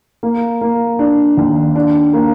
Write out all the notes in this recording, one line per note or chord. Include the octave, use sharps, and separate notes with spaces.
A#3
A#3
D4
D#2
D4
A#3